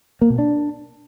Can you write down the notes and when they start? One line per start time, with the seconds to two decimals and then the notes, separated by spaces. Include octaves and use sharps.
0.21 A#3
0.30 B2
0.39 D4